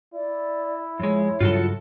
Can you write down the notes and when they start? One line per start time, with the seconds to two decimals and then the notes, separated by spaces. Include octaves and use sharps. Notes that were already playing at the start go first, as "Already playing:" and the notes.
0.14 E4 D5
1.00 F2 G#3 C#5
1.40 G2 C#3 F#3 F4 F#4 A4